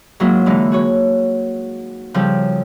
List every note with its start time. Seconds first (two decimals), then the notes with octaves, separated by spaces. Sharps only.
0.20 G#2 F#3 G#3 A#3 E4 F4
0.46 D3 E3 G#3 D#4
0.72 F#4 G#4 C#5
2.14 C#3 F3 G3 C4 A4